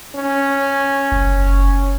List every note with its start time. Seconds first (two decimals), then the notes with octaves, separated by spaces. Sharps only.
0.15 C#4
1.12 F#1